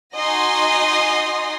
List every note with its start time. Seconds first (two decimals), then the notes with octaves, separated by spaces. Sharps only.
0.16 D#4 F#4 D#5 G#5 C6 A#6